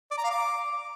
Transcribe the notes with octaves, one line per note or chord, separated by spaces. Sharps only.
D5
A#5
F5
D6